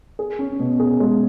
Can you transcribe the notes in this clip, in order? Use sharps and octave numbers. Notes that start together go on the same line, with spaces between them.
G#4
C#4
B2
G#4
G#3